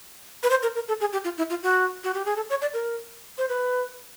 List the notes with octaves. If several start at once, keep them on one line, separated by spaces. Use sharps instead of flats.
B4
C5
A#4
A#4
A4
G#4
G4
F4
E4
F4
F#4
F#4
G4
G#4
A4
C#5
D5
A#4
C5
B4